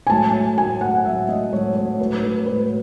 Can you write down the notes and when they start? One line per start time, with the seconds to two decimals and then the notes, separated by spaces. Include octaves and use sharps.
0.07 G#5
0.10 A2 F#3 A5
0.57 A2 F#3 G#5
0.81 F#5
1.05 A2 F#3 E5
1.29 D#5
1.52 A2 F#3 C#5
1.76 C#5
1.99 A2 F#3 B4
2.23 B4
2.46 A2 F#3 B4